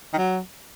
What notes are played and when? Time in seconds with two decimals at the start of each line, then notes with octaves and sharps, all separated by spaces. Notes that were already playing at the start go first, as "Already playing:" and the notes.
0.13 D#3
0.17 F#3